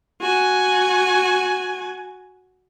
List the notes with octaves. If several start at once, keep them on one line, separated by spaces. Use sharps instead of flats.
F#4 G#5